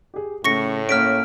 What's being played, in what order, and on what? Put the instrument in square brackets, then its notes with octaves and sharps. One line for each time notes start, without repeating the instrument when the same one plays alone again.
[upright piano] G4 G#4
[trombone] A2 [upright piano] C#3 A3 [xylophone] C#6 A#6 C#7
[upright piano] A#3 C#4 [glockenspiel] F6 B6 D7